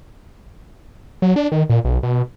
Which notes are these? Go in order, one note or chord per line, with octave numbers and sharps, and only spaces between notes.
F#3
D4
D#3
A#2
B1
B2